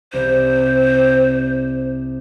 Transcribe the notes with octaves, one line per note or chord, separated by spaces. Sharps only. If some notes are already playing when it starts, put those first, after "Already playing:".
C2 C5